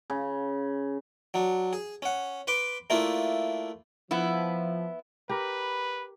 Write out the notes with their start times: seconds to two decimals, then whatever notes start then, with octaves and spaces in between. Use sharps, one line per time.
0.10 C#3
1.34 F#3 D4
1.73 G#4
2.02 C#4 F#5
2.47 B4 B5 C6 D6
2.90 A3 A#3 D4 E4 F4
4.11 F3 B3 E4
5.29 G4 A#4 B4 B5